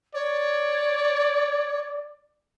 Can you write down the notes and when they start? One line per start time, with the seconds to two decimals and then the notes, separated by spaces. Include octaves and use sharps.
0.15 C#5 D5